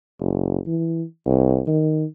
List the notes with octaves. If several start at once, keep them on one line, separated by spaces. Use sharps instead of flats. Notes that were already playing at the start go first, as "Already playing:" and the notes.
F#1
E3
C2
D#3